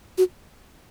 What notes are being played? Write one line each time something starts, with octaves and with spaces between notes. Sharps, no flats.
F#4